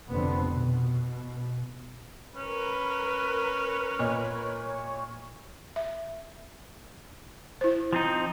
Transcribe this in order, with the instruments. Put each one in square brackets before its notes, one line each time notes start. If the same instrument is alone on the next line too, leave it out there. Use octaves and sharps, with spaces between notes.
[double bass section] F1 D3 B3 C4
B2
[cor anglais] C#4 [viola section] A#4 B4
[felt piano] A#2 D#5 F6 [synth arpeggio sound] C#5
[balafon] E5
E4 C5
[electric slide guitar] F3 C4 D#4